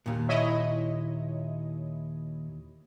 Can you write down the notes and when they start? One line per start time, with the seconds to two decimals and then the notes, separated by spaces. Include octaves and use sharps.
0.06 D#2 A#2
0.29 E4 C#5 D#5